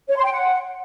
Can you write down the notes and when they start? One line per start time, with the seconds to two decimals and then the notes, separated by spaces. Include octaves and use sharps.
0.08 C#5
0.16 C6
0.23 G5
0.31 F#5